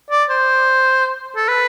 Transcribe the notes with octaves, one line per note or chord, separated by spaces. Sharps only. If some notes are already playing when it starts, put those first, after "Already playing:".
D5
C5
A4
B4